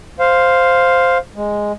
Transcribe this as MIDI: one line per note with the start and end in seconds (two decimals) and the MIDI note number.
0.20 1.18 72
0.20 1.18 77
1.36 1.72 56